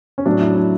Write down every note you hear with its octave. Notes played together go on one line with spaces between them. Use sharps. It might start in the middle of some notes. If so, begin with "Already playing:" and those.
C#4
A2 F#3 D4
E4
D4